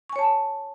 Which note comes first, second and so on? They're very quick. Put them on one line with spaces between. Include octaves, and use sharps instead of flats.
C#6 G#5 C#5 A5